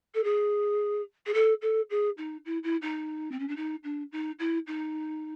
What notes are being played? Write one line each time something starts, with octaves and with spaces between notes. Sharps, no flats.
A4
G#4
G#4
A4
A4
G#4
D#4
E4
E4
D#4
C4
C#4
D4
D#4
D4
D#4
E4
D#4